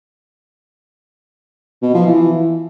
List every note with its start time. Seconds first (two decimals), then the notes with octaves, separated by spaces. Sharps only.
1.82 B2
1.94 F3
2.06 E3